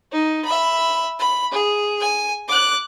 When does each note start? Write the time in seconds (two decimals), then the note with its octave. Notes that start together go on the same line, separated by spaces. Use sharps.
0.12 D#4
0.45 E5 B5
1.19 B5
1.51 G#4
2.00 G#5
2.48 D6 F#6